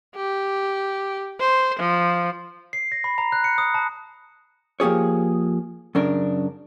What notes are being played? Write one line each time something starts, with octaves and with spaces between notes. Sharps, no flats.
G4
C5
F3
C7
A#6
B5
A#5
F#6
C#7
D#6
A5
F3 A#3 G4 G#4 C#5
F#2 C#3 D4 A#4